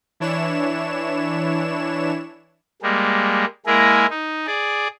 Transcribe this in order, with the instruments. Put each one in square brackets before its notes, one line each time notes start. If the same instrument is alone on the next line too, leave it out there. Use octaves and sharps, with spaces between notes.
[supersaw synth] E3 D4 E4 C#5 E7
[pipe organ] G3 G#3 A#3
G#3 A#3 E4 G#4 A#4
D#4
G#4 D5